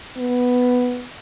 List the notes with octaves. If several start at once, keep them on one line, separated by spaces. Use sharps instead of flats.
B3